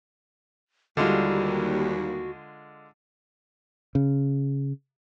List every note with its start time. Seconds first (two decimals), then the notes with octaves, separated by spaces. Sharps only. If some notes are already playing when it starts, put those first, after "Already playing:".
0.97 D#2 D3 G3 G#3 F4 F#4
3.95 C#3